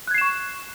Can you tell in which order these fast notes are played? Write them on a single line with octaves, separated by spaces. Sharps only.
F#6 G#6 C7 E7 C#6